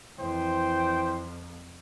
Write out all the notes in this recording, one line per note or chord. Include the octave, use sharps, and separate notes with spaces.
F2 E3 C5 G5